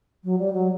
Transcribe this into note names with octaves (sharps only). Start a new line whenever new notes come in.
F#3
G3
F#3